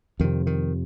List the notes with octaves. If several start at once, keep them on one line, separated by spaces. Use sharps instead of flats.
F2 C3 D#3
D#3